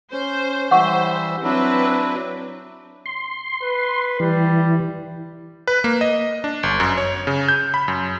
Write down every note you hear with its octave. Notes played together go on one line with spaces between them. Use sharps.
C#4 C5
E3 G3 C5 E5 F#5 C#6
F#3 C4 D4 E4 B4
C6
B4
E3 G3
B4
A#3
D#5
D4
G1
F#2
C#5
C#3
G6
B5
F#2